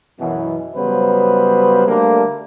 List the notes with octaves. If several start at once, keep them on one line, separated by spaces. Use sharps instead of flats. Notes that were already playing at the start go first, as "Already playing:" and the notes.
F#2 B2 E3
C#3 F#3 G3 B3 B4 C5
D3 G3 A3 A#3